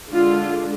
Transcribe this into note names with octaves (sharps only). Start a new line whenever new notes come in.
D3 G#3 D4 F4